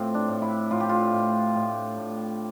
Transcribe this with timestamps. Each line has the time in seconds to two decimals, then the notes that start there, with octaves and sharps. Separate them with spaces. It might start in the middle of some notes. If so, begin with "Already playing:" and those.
Already playing: A2 A3 C4 F4 G4
0.14 D4
0.28 A2
0.42 E4
0.71 A2 F4
0.80 G4
0.89 F4
1.13 A2
1.55 A2
1.98 A2